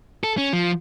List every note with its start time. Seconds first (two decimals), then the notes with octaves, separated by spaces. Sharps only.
0.24 A4
0.38 C#4
0.53 F3